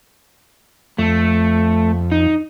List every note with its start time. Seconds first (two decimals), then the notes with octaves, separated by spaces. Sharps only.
0.98 F2 A3
2.12 D#4